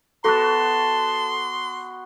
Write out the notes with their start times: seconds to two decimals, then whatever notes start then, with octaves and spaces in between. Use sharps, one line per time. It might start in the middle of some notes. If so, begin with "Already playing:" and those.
0.24 B3 F#4 A4 A5 C6 F#6